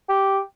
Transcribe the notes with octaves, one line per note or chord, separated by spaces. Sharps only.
G4